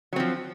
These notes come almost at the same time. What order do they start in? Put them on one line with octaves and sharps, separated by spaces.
F#3 C4 F3